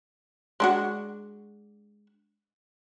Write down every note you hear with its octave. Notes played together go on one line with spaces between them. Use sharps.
G#3 D4 F#4